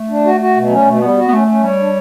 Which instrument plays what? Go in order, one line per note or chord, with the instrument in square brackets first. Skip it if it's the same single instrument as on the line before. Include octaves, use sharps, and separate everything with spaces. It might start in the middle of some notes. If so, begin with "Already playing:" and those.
Already playing: [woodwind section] A3
[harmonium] D4
F#4
F#4
B2
[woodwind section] F#3 [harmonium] C#4
[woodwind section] G3
[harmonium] B2 [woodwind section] A3
[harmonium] G3 [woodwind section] B3
[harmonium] F#4
[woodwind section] B3
[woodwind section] A3 [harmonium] C#4
[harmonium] C#4
[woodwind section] G3 [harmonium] C#5
[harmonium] D4